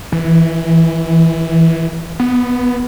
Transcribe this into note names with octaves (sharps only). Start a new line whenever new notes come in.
E3
B3